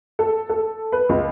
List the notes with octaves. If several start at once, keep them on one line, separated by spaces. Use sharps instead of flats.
A4
A4
B4
C#2